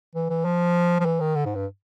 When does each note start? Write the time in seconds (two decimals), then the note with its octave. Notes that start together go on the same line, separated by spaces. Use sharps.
0.15 E3
0.30 E3
0.45 F3
1.00 F3
1.05 E3
1.20 D#3
1.36 D3
1.45 G#2
1.55 G2